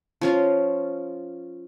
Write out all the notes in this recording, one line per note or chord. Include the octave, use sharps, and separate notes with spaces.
F3 C#4 F4